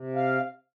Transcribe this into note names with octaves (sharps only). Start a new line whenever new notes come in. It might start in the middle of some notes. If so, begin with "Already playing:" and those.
Already playing: C3
F5